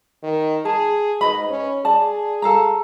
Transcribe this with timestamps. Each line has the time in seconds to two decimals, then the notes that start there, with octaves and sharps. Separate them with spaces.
0.23 D#3
0.65 G#4 A5
1.21 G#2 B4 D#5 B5
1.50 C#4
1.85 G#4 D5 A5
2.42 A4 F5 A#5